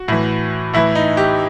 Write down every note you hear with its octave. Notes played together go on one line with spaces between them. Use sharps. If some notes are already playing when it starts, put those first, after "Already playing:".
Already playing: F#4
A2 E3
A2 E3 E4
D#4
G4